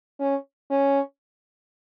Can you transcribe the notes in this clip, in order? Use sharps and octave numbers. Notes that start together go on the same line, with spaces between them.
C#4
C#4